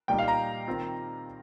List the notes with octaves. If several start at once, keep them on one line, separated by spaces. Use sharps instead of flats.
A#2 G3 D#4 G5
F5
A#5
D#3 C4 F4